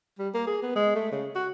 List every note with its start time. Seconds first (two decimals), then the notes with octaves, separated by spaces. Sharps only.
0.19 G3
0.34 A#3
0.47 G#4
0.63 B3
0.76 G#3
0.96 A3
1.12 C#3
1.35 F#4